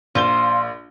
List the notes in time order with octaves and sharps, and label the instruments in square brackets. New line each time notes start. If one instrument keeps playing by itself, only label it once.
[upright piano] A#1 G7 [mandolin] F4 C5